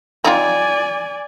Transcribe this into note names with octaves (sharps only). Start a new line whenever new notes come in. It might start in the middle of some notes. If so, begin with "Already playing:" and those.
C4 D#4 F4 D5 G#5